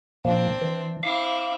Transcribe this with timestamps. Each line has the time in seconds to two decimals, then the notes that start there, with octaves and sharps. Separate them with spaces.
0.25 A#2 F3 A#3 C4 D4
0.62 E3
1.03 C4 E4 F5 D6